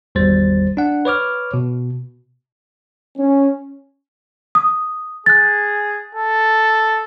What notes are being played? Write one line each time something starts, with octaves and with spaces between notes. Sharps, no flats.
G#1 E2 G3 C5 A6
D4 F#5
B4 C#5 D6 F6
B2
C#4
D#6
G#4 F#6 A6
A4